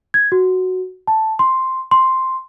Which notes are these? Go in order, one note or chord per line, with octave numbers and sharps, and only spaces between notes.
G#6
F#4
A5
C6
C6